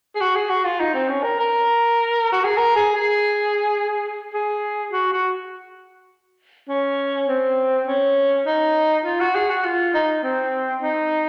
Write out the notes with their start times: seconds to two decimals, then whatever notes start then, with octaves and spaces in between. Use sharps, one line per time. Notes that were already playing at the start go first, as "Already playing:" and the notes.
0.15 G#4
0.21 F#4
0.36 G#4
0.50 F#4
0.64 F4
0.80 D#4
0.94 C4
1.09 C#4
1.23 A#4
1.39 A#4
2.32 F#4
2.44 G#4
2.57 A#4
2.76 G#4
2.95 G#4
4.34 G#4
4.92 F#4
5.12 F#4
6.69 C#4
7.28 C4
7.87 C#4
8.46 D#4
9.05 F4
9.20 F#4
9.35 G#4
9.50 F#4
9.64 F4
9.94 D#4
10.23 C4
10.82 D#4